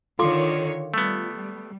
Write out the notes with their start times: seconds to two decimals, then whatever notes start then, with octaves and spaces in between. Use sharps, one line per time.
0.19 D3 D#3 F4 A4 C#5 C6 D6
0.94 G3 A3 B3